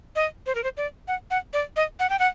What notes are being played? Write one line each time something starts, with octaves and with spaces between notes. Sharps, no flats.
D#5
C5
A#4
C5
D5
F#5
F#5
D5
D#5
F#5
G5
F#5